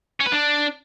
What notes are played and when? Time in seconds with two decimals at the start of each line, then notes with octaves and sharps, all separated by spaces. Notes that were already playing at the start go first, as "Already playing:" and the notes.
0.20 C#4
0.26 B4
0.32 D4